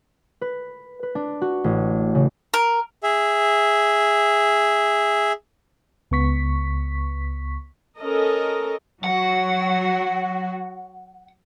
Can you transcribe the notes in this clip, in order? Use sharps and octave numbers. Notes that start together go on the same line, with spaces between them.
B4
B4
D4
F#4
A1
C#3
A#4
G#4 E5
C#2 B3 C#6 B6
C#4 A4 A#4 D#5
F#3 F#4 F#5